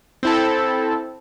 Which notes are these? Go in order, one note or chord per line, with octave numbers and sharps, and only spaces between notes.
C4 E4 A4